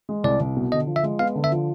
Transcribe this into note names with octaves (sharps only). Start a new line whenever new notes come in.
G#3
C2 D5
C2
B2
D3 D#5
F3
E5
G#3
B3 F5
D3
E5
F3